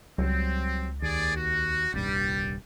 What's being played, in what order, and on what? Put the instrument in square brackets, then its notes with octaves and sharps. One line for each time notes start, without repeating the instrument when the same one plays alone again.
[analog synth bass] C#2 [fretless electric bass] F#3 G3 [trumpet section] C4
[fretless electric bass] D#2 [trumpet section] G#4 D5
[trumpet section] F#4
[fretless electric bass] D#1 C2 G2 [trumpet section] G3